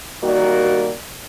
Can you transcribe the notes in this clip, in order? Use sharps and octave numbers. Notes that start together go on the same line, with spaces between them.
D#3 G3 A#3 F#4 D5